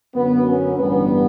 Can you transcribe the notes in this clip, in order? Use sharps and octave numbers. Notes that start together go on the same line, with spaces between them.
F#2 D3 F#3 B3
C#4
A1 G2 D3 G3 B3